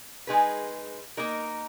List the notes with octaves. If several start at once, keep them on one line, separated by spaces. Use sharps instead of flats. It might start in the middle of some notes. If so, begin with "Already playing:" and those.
G#3 D#4 G#4 B4
A#3 D#4 A#4